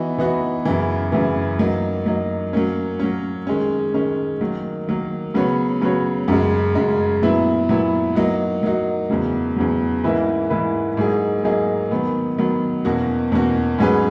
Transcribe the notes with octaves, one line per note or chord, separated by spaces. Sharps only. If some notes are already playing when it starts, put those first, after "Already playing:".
Already playing: E3 B3 D#4 F#4
E3 B3 D#4 F#4
F#2 C#3 E3
F#2 C#3 E3
F#3 A#3 D#4
F#3 A#3 D#4
F#3 A#3 C#4
F#3 A#3 C#4
D#3 G#3 C#4
D#3 G#3 C#4
D#3 F#3 A#3
D#3 F#3 A#3
C#3 F#3 B3 F#4 C#5
C#3 F#3 B3 F#4 C#5
F#2 C#3 G#3
F#2 C#3 G#3
A#2 F#3 B3 E4
A#2 F#3 B3 E4
F#3 A#3 D#4 F#4
F#3 A#3 D#4 F#4
E2 C#3 F#3
E2 C#3 F#3
G#2 E3 A#3 E4 B4
G#2 E3 A#3 E4 B4
G#2 F#3 A#3 D#4 G#4
G#2 F#3 A#3 D#4 G#4
D#3 F#3 B3
D#3 F#3 B3
E2 B2 A#3 C#4 F#4
E2 B2 A#3 C#4 F#4
G#2 F#3 C#4 G#4 B4